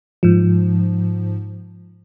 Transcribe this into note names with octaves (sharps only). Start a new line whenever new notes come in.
G#2 F3